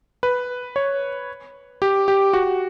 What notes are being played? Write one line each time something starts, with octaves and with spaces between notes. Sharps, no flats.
B4
C#5
G4
G4
F#4